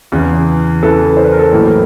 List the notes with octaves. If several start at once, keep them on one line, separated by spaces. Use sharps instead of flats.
E2 C#3 E3
E2 C#3 E3 A4 B4
C5
B4
A#4
A4 B4
A1 A2 F#3 A#3